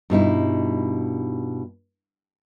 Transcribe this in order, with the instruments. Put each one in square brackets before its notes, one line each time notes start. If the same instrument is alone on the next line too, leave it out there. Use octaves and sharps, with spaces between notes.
[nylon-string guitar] G2 B2 D#4 E4